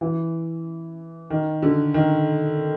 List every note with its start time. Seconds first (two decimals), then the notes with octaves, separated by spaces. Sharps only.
0.01 E3
1.30 D#3
1.62 D3
1.94 D#3